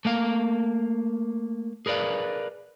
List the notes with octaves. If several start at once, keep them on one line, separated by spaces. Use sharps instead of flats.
A3 A#3 F5
G#4 A#4 B4 D5 F5